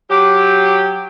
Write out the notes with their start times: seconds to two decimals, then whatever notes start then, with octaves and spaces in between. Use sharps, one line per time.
0.10 F#3 G4